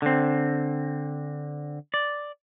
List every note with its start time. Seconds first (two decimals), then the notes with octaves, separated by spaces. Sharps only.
0.02 D3 C4
1.94 D5